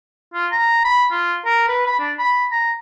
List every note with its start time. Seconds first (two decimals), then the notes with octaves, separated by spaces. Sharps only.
0.34 F4
0.52 A#5
0.84 B5
1.11 F4
1.45 A#4
1.68 B4
1.86 B5
1.99 D4
2.19 B5
2.52 A#5